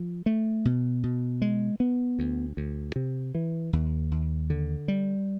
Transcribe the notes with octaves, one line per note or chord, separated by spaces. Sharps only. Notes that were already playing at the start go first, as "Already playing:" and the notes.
Already playing: F3
A3
B2
B2
G#3
B3
D2
D2
C3
E3
D#2
D#2
D3
G3